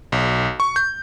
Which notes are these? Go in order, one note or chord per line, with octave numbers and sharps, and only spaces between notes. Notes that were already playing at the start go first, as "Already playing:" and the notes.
B1
C#6
G6